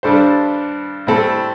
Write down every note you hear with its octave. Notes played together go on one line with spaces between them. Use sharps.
G2 G3 D4 A4 C5
A2 G3 C4 A4